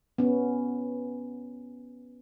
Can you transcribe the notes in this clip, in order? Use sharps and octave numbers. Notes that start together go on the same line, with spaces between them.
B3 C#4